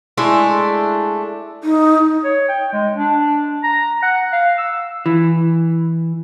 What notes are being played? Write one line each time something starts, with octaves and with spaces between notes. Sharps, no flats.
G#3 A3 D4 E4
D#4
C#5
G5
G#3
D4
A#5
F#5
F5
E6
E3